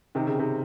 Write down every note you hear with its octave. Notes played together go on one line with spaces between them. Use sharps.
C3 D#3
C#3
C3 D#3